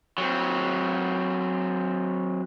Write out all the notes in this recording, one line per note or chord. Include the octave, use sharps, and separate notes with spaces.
F#3 C4